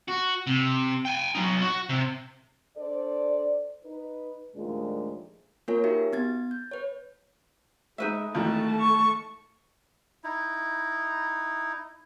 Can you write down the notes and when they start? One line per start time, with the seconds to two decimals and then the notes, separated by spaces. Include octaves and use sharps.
0.08 F#4
0.47 C3
1.05 G5 G#5
1.35 F#3 D#4
1.61 F#4
1.89 C3
2.78 D4 A4 C5 D5
3.85 D#4 B4
4.55 D#2 A#2 F3 G#3 A3 D4
5.68 A#3 F4 A#4 C#5 G#5
5.84 D#4 F#4 G4 E5
6.13 B3 G#6 A6
6.51 G6
6.71 B4 C#5
7.98 G#3 D#4 B4 E5
8.34 G#1 D#2 E3 A3 A5
8.80 C#6
10.24 D#4 E4